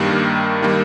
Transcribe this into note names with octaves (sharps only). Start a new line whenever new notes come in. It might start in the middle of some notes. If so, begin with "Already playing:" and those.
Already playing: G2 D#3 G3 A#3
D#3 G3 A#3